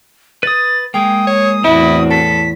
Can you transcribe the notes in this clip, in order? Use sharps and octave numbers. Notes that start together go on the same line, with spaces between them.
B4 D#6 A6
G#3 A#3 G5 D#6
C#5
E2 A2 C4 E4 F#4
A4 B6